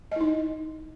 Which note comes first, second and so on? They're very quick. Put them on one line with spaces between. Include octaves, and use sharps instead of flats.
D#5 E4 D#4